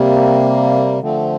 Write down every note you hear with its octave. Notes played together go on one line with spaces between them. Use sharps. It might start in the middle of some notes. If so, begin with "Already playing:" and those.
Already playing: C3 G3 A#3
D3 F3 A3 C4